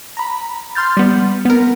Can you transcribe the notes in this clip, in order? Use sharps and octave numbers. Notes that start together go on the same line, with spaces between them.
A#5 B5
C6 F6 G6 A6
G3 B3
B3 A#4